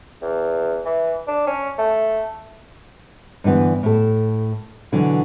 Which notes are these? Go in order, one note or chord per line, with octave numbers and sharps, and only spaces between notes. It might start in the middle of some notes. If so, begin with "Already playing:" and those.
E2
E3
D4
C#4
A3
G2 D3 E3 B3
A2 A4
B2 D3 E3 F#3